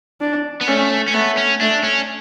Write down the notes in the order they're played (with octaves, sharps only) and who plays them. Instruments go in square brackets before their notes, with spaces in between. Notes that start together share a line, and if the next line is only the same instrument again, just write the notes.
[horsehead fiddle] D4
[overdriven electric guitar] B3
[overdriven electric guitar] A3 [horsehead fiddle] C#4
[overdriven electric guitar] C#4
[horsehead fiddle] A3 [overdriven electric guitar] B3
[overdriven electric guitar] C#4
[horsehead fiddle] A3 [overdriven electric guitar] D4
[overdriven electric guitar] C#4